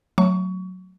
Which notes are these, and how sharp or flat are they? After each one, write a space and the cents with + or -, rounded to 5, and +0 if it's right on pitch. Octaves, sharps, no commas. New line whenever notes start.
F#3 +0 A3 +0 C#6 +25